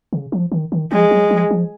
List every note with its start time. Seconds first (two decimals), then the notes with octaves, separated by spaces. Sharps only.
0.13 C#3
0.32 F3
0.52 D#3
0.72 D#3
0.92 F3 G#3
1.11 F#3
1.30 F3
1.51 F3